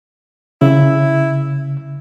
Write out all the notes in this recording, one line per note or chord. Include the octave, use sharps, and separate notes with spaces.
C#3 E4